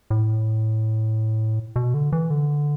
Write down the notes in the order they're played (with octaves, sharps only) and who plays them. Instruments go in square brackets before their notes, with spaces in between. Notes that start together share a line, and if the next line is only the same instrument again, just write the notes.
[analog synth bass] A2
B2
D3
E3
D3